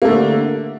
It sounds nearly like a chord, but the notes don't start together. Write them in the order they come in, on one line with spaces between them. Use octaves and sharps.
A#3 A3 D3